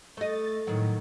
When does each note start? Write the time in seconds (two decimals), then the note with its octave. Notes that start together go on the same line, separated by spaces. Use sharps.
0.17 A3 D#5 A6
0.67 A2 D#3 F#3